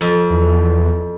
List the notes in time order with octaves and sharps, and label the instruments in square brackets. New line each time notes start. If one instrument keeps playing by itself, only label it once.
[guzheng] F2
[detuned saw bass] E2